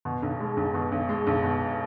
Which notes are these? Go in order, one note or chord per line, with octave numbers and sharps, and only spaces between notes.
B2
B1
G#3
B1
B2
B1
G#3
B1
B2